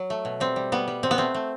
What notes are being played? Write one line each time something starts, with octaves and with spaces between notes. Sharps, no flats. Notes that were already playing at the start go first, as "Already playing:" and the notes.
Already playing: F#3
A3
B2
G3 C4
G3
G3 B3
G3
B2 C4
B3
A3 C4
A3